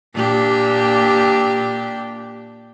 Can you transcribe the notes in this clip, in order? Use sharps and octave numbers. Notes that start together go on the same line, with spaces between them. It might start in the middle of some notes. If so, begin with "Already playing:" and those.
A#2 D4 G4